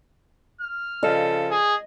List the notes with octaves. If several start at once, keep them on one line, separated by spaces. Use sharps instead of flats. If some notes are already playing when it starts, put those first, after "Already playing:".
F6
C#3 F3 A4 D#5
G#4